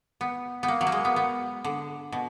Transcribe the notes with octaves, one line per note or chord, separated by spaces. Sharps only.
B3
B3
A#3
F#3
A#3
G#3
B3
B3
D3
B2